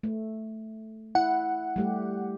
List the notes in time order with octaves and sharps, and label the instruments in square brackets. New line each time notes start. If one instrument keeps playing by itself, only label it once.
[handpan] A3
[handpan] E4 [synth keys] F#5
[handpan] G3 A3 G4